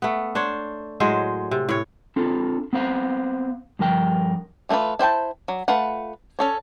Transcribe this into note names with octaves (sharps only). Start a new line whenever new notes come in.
A3 B3
D4 C5 C#5
A2 F#3 G#3 C5
C3
A2 C#5
C4 D4 F4 A4
B3 C4 C5 F5
G2 F3 A#4 G5
E3 A3 D4 F4 B4
E4 C5 G5 A5
F#3
A3 F4 B4 F#5
C#4 A4 C#5